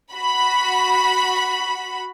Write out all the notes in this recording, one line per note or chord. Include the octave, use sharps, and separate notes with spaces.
F#4 B5